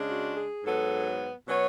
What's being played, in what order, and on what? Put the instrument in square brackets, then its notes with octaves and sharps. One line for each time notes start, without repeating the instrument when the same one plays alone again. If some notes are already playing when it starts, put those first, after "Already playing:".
Already playing: [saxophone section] C#3 G#3 D4
F#4
G#4
G#2 F#3 B3 A4
B2 F#3 B3 C#5